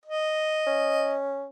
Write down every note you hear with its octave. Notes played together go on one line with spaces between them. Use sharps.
D#5
C#4